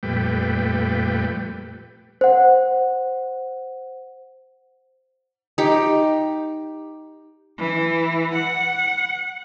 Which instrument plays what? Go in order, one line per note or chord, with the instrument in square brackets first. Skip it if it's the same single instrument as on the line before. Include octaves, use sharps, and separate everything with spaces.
[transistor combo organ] F2 A#2 G3 A3 B4 G5
[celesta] C5 F#5
[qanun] D#4 G4
[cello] E3
F#5